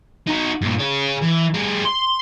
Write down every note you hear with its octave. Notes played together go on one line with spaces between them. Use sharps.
D#4 F#4
G2 A#2
G#4 C#5
E3
G3 G#4
C6